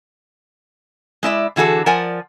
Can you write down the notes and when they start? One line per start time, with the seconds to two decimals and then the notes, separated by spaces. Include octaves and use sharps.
1.23 G#3 E4 D5 E5
1.56 D3 E3 F#4 G#4 A4
1.86 F3 A#4 D5 F#5 G#5